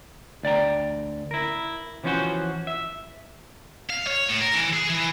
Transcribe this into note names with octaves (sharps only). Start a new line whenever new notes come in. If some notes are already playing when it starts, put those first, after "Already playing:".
D2 D5 G5 A#5
E4 A#4
E3 F3 C#4 D#4 F#4 C5
E5
F5
C#5
A2
A#4
E3
G#4
E3